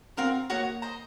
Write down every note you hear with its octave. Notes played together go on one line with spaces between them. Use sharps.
C4 F#4 A#4 F5
A#3 D#4 F#4 C#5 F#5
C5 D#5 A#5